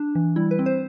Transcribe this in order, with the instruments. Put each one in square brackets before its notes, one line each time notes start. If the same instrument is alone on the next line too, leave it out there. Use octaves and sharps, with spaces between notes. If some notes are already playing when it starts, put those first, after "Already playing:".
Already playing: [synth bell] D4
E3
G3 E4
B4
C4
C5